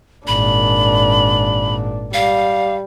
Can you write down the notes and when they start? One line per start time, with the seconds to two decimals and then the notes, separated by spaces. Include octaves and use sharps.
0.27 G#1 A#2 D4 B5
2.14 G3 F5